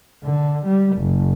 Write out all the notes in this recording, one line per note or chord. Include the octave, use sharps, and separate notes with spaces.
D3
G3
F#1